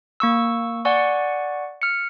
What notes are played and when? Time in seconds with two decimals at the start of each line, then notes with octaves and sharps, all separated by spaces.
0.20 A#3 C#6 E6
0.85 D5 F#5 G#5 C#6
1.82 F6 C#7